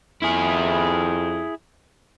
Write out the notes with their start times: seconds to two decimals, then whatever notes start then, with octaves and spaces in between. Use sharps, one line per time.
0.22 F2 E4 G#4